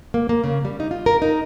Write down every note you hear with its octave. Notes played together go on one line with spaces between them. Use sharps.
A#3
A#3
C#3
G3
D#4
F4
A#4
D#4